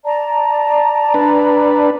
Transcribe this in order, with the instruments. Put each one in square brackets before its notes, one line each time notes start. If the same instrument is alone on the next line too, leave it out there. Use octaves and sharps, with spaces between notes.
[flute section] D5 A5 A#5
[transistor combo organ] D4 B4